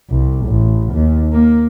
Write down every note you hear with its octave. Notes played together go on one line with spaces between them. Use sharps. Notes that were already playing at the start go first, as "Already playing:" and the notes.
C2
A1
D#2
A#3